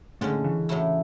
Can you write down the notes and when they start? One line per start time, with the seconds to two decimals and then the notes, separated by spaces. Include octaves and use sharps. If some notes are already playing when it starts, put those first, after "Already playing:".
0.21 A2 D3 G#3 C#4
0.44 C#3 E3
0.69 A2 F#3 A3 E4